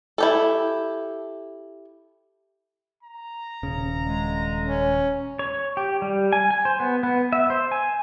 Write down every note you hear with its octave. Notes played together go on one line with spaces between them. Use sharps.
E4 G4 A4
A#5
D#1 C#3
D3 G#3
C#4
C#5
G4
G3
G#5
G#5
C5
B3
B3
E5
C5
G#5